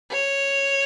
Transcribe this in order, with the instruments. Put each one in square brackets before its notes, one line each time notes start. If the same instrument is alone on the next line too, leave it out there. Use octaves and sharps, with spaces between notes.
[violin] C#5